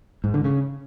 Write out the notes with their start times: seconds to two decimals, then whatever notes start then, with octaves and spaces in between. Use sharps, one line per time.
0.24 G#2
0.34 D3
0.44 C#3